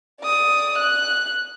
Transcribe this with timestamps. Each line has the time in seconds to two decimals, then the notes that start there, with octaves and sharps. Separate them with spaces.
0.21 D5 D#6
0.78 F#6